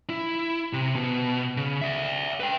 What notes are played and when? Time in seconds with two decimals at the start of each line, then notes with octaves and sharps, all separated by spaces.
0.09 E4
0.73 C3
0.95 B2
1.57 C#3
1.81 D5 E5
2.40 B4 G5